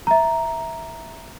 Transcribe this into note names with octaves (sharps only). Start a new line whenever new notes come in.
E5 A#5